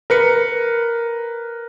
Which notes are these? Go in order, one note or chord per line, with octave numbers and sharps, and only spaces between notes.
A#4 B4 C#7